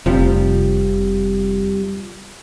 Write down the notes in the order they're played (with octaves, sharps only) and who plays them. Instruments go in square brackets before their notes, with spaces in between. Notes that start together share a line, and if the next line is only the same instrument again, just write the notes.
[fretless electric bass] F1 [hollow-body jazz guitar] C3 F3 G3